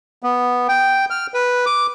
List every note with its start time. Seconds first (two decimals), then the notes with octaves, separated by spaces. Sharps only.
0.23 B3
0.68 G5
1.10 F6
1.34 B4
1.66 D6